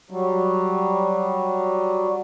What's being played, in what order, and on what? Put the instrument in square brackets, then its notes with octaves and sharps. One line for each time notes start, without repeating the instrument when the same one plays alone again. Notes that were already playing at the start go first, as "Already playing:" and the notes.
[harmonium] F#3 G3